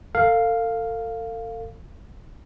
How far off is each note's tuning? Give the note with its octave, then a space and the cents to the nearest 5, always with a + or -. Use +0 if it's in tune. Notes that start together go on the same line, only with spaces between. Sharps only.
A4 +40 F5 +0